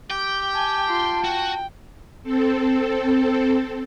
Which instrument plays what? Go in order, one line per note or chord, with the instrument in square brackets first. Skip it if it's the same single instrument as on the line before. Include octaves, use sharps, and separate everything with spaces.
[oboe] G4 [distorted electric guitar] G5
[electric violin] G#5 [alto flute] A5
[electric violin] F4 C6
[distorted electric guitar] F#4 [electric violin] G5
[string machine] C4 A4